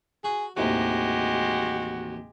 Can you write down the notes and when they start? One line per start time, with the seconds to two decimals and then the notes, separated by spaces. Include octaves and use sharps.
0.24 F#4 G#4
0.57 A1 D#2 C3 G#3 F#4 G4